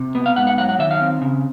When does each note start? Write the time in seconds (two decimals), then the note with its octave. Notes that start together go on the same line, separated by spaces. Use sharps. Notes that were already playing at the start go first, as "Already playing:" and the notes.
Already playing: C3
0.15 B3
0.26 F5
0.36 G#2 F#5
0.47 F#5
0.58 F#3 F#5
0.69 F#5
0.79 D#3 E5
0.91 F5
1.01 C4
1.22 C#3